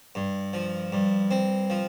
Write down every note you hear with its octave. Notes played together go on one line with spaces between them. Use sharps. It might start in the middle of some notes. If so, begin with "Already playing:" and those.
G2
F3
G2
C4
F3